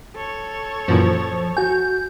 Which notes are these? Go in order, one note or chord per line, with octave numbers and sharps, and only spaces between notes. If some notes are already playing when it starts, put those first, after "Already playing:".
A4 C#5
F#2 A#2 E3 F3
F#4 G#5 G6